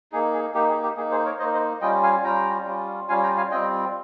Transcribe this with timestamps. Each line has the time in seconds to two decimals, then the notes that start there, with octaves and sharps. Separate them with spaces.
0.12 A#3 D#4 G#4
0.34 G#4
0.55 A#3 D#4 G4
0.69 G#4
0.83 G4
0.97 A#3 D#4 G#4
1.11 G#4 C5
1.25 A#4 C#5
1.39 D#4 C5 D#5
1.43 A#3
1.53 C5 D#5
1.81 G3 C#4 F4 D#5 G5
2.03 F5 G#5
2.24 G3 C#4 F4 G5 A#5
2.66 G3 C#4 F4
3.09 G3 C#4 F4 F5 G#5
3.23 G5 A#5
3.37 F5 G#5
3.51 G3 C4 F4 D#5 G5